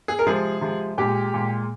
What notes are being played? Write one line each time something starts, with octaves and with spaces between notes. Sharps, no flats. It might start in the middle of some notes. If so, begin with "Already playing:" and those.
G#4
A#4
C3 F3 G#3 G#4
C3 F3 G#3
A#2 G#3 G4
A#2 G#3